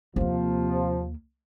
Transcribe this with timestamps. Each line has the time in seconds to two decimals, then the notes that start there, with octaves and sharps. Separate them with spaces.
0.16 D#2 C3 F3 A#3